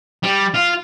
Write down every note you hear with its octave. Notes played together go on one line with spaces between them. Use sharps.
G3
F4